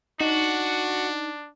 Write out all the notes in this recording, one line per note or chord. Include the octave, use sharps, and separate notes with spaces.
D4 D#4 F#4